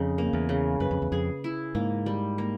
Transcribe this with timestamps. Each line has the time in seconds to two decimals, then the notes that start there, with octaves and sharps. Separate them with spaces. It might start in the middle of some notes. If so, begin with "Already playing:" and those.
Already playing: F2 C#3 D#4
0.18 A#3
0.33 E2
0.49 C#3
0.80 F#2 B4
0.91 F2
1.02 E2
1.12 F2 G#4
1.44 E4
1.75 G#2 A#3
2.06 G3
2.38 A#3